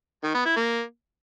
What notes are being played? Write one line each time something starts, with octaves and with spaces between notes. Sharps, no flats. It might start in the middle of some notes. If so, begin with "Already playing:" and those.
D#3
B3
E4
A#3